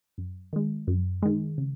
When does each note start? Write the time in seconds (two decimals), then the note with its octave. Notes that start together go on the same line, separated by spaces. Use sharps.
0.18 F#2
0.53 D#3 G#3
0.87 F#2
1.22 D#3 G#3
1.58 C#3